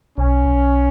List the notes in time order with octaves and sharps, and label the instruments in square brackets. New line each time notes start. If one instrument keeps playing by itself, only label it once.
[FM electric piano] B1 [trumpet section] C#4
[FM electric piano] B1